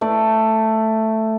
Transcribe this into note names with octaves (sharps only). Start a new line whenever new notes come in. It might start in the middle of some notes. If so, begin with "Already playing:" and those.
A3 D5